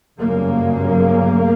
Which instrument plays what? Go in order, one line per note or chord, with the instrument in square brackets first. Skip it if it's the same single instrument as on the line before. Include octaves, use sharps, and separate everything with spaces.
[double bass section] G1 F#2 C#3 A#3